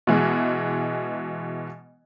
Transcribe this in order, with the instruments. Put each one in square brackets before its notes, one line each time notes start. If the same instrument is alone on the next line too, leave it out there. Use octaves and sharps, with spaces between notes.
[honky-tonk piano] B2 E3 G#3